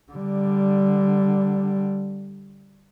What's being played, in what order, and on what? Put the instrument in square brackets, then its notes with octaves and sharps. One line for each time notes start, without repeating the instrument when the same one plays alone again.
[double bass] D3 G3